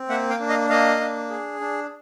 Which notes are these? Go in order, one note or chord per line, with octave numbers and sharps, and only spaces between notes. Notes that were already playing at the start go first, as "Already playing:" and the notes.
Already playing: C4
A#3 E5 F#5
F5 G5
D4
D#5 F5
A#3 D#5 F5
D4
G#4
D4